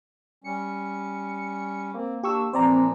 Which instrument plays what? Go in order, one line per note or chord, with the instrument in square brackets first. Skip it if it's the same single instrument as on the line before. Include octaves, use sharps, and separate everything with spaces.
[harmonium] G3 C#4 [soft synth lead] C#7
[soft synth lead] A#3 [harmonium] C4
[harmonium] D4 [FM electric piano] G4 C#6 E6
[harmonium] A#2 E3 F3 [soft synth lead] C4 [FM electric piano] C5 D5 A#5